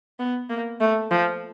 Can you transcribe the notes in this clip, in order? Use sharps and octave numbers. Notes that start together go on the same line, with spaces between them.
B3
A#3
A3
F3